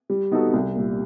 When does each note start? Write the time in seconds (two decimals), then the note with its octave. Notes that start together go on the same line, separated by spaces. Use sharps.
0.10 G3
0.32 B3 D#4 F#4 A4
0.54 C2
0.76 A#2 G3